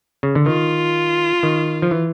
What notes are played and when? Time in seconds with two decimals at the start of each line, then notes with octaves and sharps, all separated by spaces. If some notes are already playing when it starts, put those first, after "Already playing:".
0.23 C#3
0.35 D3
0.46 D#3 F4
1.43 D#3
1.82 F3
1.91 E3